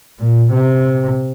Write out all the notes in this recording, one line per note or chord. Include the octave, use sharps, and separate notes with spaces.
A#2
C3